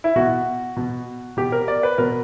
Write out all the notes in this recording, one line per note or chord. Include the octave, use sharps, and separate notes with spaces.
E4
B2 F#4
B2
B2 G4
A#4
D5
B4
B2 A#4